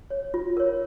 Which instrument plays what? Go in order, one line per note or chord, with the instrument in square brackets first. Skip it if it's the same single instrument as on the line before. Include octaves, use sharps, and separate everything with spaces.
[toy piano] C#5
F4
A#4 C#5